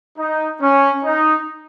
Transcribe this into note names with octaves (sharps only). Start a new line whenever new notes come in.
D#4
C#4
D#4